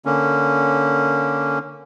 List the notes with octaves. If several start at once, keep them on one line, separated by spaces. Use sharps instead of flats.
D3 A#3 C#4